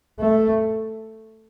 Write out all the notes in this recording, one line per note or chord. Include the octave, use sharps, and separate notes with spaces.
A3